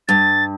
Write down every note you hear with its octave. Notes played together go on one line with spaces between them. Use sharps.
G2 A6